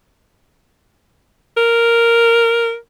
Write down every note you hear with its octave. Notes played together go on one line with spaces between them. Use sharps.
A#4